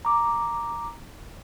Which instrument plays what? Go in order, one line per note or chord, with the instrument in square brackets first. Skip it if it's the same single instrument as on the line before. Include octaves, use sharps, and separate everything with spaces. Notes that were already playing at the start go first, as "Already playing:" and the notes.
[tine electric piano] A#5 D6